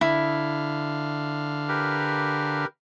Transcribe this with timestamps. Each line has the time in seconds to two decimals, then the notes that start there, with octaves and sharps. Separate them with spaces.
0.01 D3 E4 F5
1.69 G4 A#4 B4